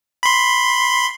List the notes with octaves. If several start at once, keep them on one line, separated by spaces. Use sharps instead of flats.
B5 C6